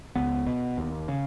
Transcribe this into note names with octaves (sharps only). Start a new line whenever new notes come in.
C#2 B3
B2
D#2
C#3